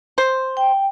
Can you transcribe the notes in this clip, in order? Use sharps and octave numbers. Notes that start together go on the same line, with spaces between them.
C5
G5